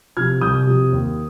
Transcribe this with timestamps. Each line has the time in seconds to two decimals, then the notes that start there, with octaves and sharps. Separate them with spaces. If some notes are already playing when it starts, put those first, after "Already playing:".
0.17 C3 F3 F6 G#6
0.41 C2 D#6 G6
0.67 C3 F3
0.92 D#2